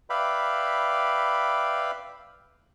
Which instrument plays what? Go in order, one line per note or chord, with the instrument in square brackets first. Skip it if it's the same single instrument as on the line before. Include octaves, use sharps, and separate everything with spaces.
[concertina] B4 D5 E5 F5 G5 B5